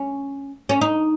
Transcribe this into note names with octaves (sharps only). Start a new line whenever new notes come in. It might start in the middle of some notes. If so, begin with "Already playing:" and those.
Already playing: C#4
C#4
D#4